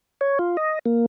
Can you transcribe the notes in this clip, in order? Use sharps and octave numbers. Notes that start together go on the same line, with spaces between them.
C#5
F4
D#5
A#3